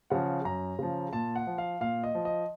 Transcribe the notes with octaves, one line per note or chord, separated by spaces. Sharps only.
C#3 F3 F#5
F#2 A#5
C#3 F3
A#2 A5
F#5
F3
F5
A#2 F5
D#5
F3
D#5